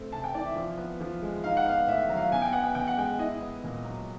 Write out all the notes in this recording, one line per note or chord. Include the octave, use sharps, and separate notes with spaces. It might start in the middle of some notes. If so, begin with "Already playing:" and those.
Already playing: A3 C4
C3 A5
G5
E3 D5
E5
F3
B3
F3
G#3
D#4 F5
F#5
B3 F5
A2 E5
F#3
F5
B2 G#5
G5
B3 F#5
G5
B2 G5
F#5
G#3 G5
E4 D#5
B3
A#2
F#3